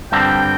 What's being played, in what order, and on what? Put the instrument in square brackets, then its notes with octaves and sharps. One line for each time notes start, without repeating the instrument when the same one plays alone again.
[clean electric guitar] G2 D3 G3 C4 [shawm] G5